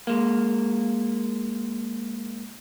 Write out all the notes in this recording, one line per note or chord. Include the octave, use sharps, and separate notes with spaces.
G#3 A#3